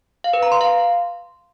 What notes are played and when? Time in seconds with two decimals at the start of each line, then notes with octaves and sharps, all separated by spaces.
0.24 F5
0.33 B4
0.43 A#5
0.52 C6
0.61 F5